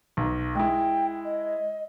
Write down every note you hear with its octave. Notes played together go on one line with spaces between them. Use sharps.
B1
G#3 E4 G5
D#5